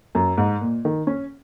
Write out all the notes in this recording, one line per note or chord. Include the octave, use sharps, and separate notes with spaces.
F#2
G#2
A#2
D#3
C#4